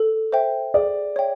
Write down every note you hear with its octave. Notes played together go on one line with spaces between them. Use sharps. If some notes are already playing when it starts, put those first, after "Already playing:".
Already playing: A4
C5 E5 G5
G#4 D5
C#5 E5 G5